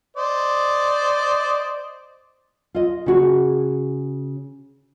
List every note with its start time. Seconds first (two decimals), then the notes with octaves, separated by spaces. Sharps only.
0.17 C5 D5 D#5
2.74 F4 D#5
3.06 C#3 F#4 G#4